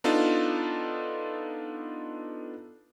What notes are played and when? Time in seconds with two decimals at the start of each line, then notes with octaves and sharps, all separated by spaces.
0.04 B3 D4 D#4 F4 A4